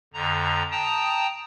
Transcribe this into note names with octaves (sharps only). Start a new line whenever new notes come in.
F2 D3 A#5
G5 A5 A#5 D#6